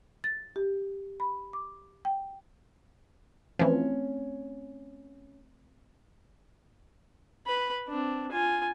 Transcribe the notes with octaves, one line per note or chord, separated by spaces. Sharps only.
A6
G4
B5
D6
G5
E3 F3 A3 C4 C#4
B4 B5
C4 D4
F4 G#5